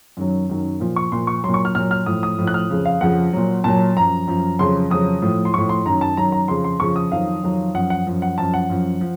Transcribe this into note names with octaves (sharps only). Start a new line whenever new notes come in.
F#2 D#3 F#3
F#2 D#3 F#3
A#2 F3
C#6
A#2 F3 C6
C#6
A#2 F#3 C6
C#6
F6
A#2 F#3 F6
F6
A2 F3 D#6
D#6
A2 F3
F#6
F6
F2 C#3 F3
F5
F2 C#3 F3 F#5
A#2 F#3
A#2 F#3 A5
F#2 F3 A#5
F#2 F3
F2 C#3 F#3 C6
F2 C#3 F#3 D#6
A2 F3
C6
A2 F3 C#6
C6
F#2 D#3 F#3 A#5
A5
F#2 D#3 F#3 A#5
A#5
F2 C#3 F3 C6
C6
F2 C#3 F3 C#6
D#6
F2 D#3 F#3 F5
F2 D#3 F#3
F#2 F3 F#5
F#5
F#2 F3
F#5
F#2 F3 A5
F#5
F#2 F3
F3